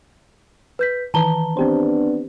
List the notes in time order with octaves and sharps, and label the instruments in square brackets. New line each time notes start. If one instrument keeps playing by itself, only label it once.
[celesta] B4 G6 B6
[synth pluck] D#3 E3 B4 [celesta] A5 A#5 G7
[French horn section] B3 D4 [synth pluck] C4 G4 C5